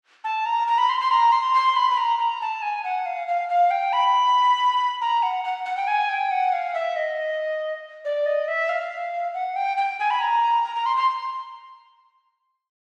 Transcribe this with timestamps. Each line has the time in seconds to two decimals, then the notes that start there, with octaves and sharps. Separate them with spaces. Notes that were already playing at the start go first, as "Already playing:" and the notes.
0.24 A5
0.46 A#5
0.68 A#5
0.78 B5
0.89 C6
1.00 C6
1.11 A#5
1.32 C6
1.54 C6
1.76 B5
1.90 B5
1.97 A#5
2.19 A#5
2.41 A5
2.62 G#5
2.84 F#5
3.06 F5
3.28 F5
3.49 F5
3.71 G5
3.93 B5
5.01 A#5
5.23 F#5
5.44 F#5
5.66 F#5
5.77 G5
5.88 G#5
6.09 G5
6.31 F#5
6.53 F5
6.74 E5
6.96 D#5
8.05 D5
8.26 D#5
8.48 E5
8.69 F5
9.34 F#5
9.56 G5
9.77 G5
10.00 G#5
10.10 B5
10.21 A#5
10.64 A#5
10.76 A#5
10.86 C6
10.96 C6